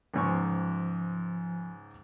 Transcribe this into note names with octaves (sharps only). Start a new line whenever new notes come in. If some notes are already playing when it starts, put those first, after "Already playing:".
C#2 G#2 F3 C#6